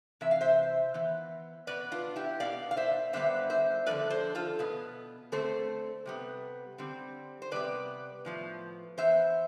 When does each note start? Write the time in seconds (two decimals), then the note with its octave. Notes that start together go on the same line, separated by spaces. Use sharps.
0.21 C3 E3 E5
0.31 F5
0.41 C5 E5
0.94 E3 B3
1.67 B2 B3 B4 D5
1.92 D4 F4
2.16 E4 G4
2.40 B2 B3 D5 F5
2.71 F5
2.77 C5 E5
3.13 D3 G3 B3 C5 E5
3.50 C5 E5
3.86 D3 F3 A3 C4 B4 D5
4.10 A4 C5
4.35 F4 A4
4.59 B2 B3
5.32 D3 A3 C4 A4 C5
6.06 C3 G3 B3
6.78 D3 G3 C4
7.42 C5
7.51 C3 G3 B3 B4 D5
8.25 A2 F3 B3
8.97 E3 B3 C5 E5